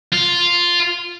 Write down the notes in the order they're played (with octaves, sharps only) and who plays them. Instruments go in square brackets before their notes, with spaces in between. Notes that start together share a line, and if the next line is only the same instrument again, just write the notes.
[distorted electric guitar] F4